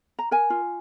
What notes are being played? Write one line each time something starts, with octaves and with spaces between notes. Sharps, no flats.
A#5
A#4 G#5
F4